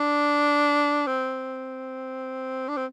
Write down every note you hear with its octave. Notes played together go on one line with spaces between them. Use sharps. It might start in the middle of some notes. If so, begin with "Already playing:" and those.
Already playing: D4
C4
D4
C4